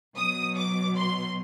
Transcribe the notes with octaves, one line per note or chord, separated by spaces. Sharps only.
B2 F#3 D#6
D6
C6